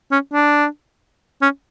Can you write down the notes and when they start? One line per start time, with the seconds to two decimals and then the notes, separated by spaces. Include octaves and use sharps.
0.11 C#4
0.33 D4
1.42 C#4